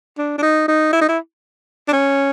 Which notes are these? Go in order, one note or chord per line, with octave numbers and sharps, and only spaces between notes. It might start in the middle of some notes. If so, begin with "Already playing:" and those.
D4
D4
D#4
D#4
E4
D#4
E4
D4
C#4